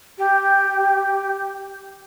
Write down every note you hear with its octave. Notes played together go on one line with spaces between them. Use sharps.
G4